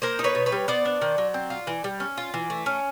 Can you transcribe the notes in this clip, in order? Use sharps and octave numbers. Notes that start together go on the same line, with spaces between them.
A#3 A#4 C5
D#4
B4 C#5
B2
B4 C#5
G3
B3 C5 D5
D4
D#3
F#3
C4
F4
E3
G3
C#4
F4
E3
A3
C#4